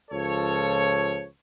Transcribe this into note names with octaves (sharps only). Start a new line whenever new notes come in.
C#2 F3 A4 C#5